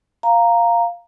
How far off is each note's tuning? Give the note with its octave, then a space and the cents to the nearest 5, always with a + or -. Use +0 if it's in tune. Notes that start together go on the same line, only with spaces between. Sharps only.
F5 +0 A#5 +0